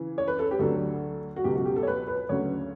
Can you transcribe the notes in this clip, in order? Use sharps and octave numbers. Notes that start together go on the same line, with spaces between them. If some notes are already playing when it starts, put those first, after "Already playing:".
Already playing: C#3 E3
C#5
B4
A4
G4
D2 D3 F#3 A4
F#4
C#2 B2 F#3 G4
F#4
G4
A4
C#5
B4
B4
D2 C#3 F#3 C#5